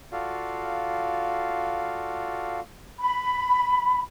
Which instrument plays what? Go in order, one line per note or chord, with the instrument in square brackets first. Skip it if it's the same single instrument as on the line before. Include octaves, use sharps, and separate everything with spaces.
[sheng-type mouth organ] F4 F#4 A4 D5 F5
[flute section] B5